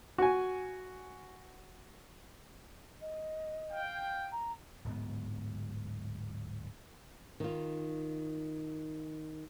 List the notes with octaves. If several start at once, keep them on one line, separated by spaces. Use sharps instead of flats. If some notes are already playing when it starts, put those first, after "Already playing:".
F#4 G#5
D#5
F5 G5
A#5
D1 G#2 B3
D#3 F4